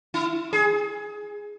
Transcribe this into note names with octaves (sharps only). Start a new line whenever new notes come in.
E4
G#4